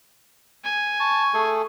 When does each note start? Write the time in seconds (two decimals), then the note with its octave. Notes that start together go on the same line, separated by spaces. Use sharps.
0.64 G#5
1.00 A5 C#6
1.34 A3 G#4 A4